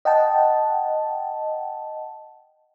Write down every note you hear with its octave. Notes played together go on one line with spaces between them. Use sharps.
D#5 F#5 G5 A5